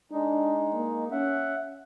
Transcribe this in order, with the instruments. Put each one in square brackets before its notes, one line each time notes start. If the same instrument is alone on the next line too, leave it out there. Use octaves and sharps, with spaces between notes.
[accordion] G#3 D#4 [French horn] D4
[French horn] A#3
[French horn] C#4 [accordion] E5 F#5